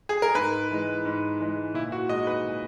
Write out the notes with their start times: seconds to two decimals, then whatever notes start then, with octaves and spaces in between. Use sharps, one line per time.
0.09 G#4
0.22 A#4
0.35 G#2 B4
0.71 E3 G#3
1.05 G#2
1.40 E3 G#3
1.74 A#2 E4
1.92 F#4
2.09 G#3 D#4 D#5
2.27 B4
2.44 A#2